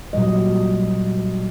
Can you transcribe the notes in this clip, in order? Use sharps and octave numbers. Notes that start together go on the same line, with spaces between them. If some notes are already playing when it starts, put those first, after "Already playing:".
A#2 F#3 G3 D#5